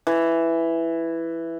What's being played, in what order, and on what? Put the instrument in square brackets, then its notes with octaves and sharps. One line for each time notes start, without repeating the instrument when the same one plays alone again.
[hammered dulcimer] E3